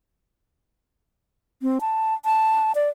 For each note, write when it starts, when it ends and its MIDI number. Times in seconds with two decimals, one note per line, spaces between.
1.62 1.78 60
1.81 2.14 81
2.25 2.72 81
2.75 2.89 74